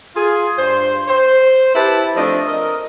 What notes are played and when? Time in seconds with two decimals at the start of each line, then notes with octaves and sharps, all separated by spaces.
0.16 F4 G#4
0.57 G2 C5
1.07 C5
1.74 C4 E4 G4 B4 A5
2.16 F3 A3 C4 D4 D#5
2.47 A#4 D#5